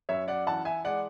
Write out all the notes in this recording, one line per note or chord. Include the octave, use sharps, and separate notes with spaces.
F#2 C#5 E5
D5 F#5
E3 F#5 A5
E5 G#5
G#3 D5 F#5